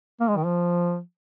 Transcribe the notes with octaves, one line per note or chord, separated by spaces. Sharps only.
A#3
G#3
D#3
F3